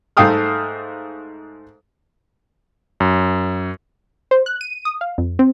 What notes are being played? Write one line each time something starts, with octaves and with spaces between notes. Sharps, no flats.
G#2 A3 F5 G5 D#6 F6
F#2
C5
F#6
D#7
D#6
F5
F2
C4